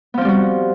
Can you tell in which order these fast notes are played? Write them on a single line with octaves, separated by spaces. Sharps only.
B3 F3 C4 G3 F#4